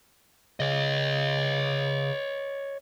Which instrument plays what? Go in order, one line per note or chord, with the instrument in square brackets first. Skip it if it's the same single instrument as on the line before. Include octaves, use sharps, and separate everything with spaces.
[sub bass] C#3 [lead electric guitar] C#5 D#5